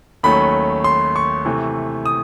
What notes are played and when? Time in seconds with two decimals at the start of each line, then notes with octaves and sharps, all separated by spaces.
0.23 D#2 D#3 F#3 A3 C#4 B5
0.84 C6
1.16 C#6
1.45 C3 E3 A3
2.06 D#6